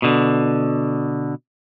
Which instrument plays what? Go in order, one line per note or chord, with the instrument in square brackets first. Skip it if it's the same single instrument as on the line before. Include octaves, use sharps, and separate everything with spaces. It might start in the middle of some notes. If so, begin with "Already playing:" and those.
[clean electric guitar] B2 D3